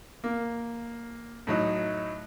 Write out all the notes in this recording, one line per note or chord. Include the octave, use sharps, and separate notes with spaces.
A#3
A2 F#3 D#4